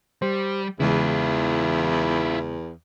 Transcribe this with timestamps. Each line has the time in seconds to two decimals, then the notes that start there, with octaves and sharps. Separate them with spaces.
0.22 G3 G4 C5
0.80 E2 C#3 E3 G#3 E4 F4